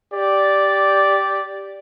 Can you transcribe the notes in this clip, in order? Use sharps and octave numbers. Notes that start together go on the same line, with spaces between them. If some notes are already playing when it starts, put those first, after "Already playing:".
G4 D5